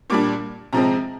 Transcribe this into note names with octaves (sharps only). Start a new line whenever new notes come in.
A#2 G3 D4 D6
C3 F3 G#3 C4 A#5